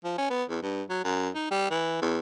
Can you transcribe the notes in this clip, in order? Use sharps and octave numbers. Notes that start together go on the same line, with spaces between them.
F3
C#4
B3
E2
G2
F#3
F#2
D#4
G3
E3
E2